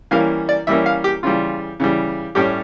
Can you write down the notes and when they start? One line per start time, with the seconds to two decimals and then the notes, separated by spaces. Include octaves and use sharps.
0.11 E3 G3 A#3 C#4 F5
0.49 D5
0.67 E3 G3 A#3 C#4 E5
0.86 F5
1.04 G4
1.23 C#3 E3 G3 F4
1.80 C#3 E3 G3
2.35 A2 G3 C#4 G4